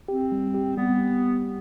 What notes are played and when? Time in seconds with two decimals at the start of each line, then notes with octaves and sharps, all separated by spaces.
0.08 C4 G4
0.32 G3
0.54 G4
0.77 G3 B3